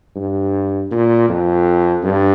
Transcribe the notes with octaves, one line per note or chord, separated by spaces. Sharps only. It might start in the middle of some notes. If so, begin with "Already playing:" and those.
G2
A#2
F2
G2